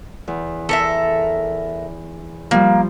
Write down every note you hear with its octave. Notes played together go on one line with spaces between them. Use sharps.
E2
A4 A#4 E5
F3 G3 A#3